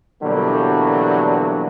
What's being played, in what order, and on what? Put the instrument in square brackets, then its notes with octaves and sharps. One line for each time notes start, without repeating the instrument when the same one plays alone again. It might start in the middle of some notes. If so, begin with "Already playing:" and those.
[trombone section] B2 D3 E3 F#3 G3 A#3